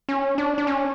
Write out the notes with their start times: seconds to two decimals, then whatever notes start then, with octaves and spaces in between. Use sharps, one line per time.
0.09 C#4
0.38 D4
0.58 D4
0.67 C#4